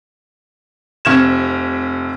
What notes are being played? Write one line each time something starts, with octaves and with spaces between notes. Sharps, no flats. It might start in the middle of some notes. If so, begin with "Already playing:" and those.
F1 C3 F6 G#6 E7